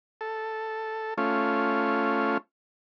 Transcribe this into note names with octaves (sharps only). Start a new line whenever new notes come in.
A4
A3 C#4 F4